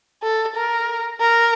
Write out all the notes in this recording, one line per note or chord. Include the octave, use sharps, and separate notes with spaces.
A4
A#4
A#4